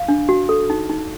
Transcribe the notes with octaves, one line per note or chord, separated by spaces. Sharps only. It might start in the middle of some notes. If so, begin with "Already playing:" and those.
Already playing: F5
D4
F#4
A4
D#4
D#4